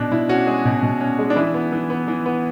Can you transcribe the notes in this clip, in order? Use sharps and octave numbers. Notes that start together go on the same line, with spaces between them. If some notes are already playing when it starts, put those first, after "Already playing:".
Already playing: B2 D4
B2 E4
C#4 F#4
G#3 G#4
B2
B2
C#4
G#3
D4
E3 E4
B3
E3
B3
E3
B3